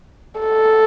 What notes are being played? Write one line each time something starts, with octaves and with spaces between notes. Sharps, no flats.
A4